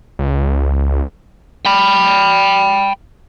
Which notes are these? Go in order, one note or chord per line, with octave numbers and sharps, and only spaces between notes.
C#2
G5 B5